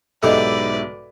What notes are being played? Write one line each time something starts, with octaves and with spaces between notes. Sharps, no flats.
B1 G#2 E4 G4 A4 B4 D5 D#5